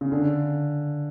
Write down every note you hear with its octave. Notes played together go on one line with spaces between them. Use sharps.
C#3
D3